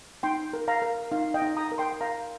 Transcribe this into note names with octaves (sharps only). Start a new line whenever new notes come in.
D#4 G5 C6
A#4
F5 A#5
A#4
D#4 F5
D#5 G5
D#4
A#5 D#6
A#4
G5 C6
A#4 F5 A#5